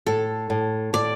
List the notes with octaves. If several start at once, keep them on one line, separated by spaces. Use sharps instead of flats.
A2 A4
A2
A2 D5